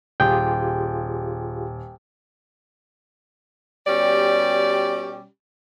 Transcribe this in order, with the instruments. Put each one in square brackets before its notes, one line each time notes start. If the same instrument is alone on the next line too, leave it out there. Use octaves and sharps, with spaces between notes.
[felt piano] D#1 [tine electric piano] F4 G4 G#4 [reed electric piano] G5
[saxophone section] B2 G3 C#4 G4 D5